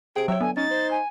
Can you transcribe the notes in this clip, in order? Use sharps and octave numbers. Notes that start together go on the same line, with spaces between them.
C3 G#4 G5 D7
F#3 C#5 E5 G5
D3 B3 G#5
C#4 D#4 A6
C5
G#5